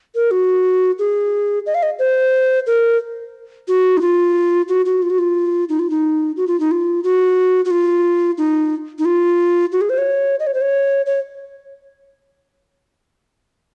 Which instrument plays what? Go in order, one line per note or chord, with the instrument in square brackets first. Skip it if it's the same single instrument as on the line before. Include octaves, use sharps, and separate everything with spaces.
[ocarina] A#4
F#4
G#4
D#5
F5
D#5
C5
A#4
F#4
D#4
F4
F#4
F#4
F4
F#4
F4
D#4
F4
D#4
F#4
F4
D#4
F4
F#4
F#4
F4
D#4
D#4
F4
F#4
G#4
C5
C#5
D#5
C#5
C5
C#5
C#5